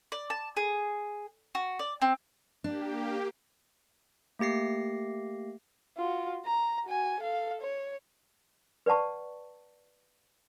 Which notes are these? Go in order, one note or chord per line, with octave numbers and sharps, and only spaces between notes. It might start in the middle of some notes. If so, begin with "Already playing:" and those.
D5
A5
G#4
F#4
D5
C4
A#3 D4 G4
A3 A#3 G4 A#6 C7
F4 F#4
A#5
F#4 G#5
A4 F5
C#5
B4 D5 F#5 A5 C#6